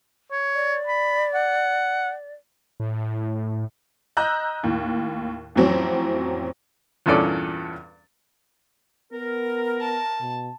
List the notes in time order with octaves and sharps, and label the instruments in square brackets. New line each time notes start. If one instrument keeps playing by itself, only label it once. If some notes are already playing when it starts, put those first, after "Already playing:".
[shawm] C#5
[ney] D5
[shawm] B5
F#5
[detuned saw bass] A2
[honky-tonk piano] D#5 A#5 E6 F#6 G6
D#2 A2
F2 A2 E3 F#3 C4 C#4
[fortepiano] E2 G2 A#2 C#4 A4 D5
[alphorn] B3 [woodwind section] A#4
[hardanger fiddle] A5
[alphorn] B2